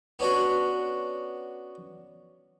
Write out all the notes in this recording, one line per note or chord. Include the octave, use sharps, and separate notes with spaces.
B3 C#4 D4 F#4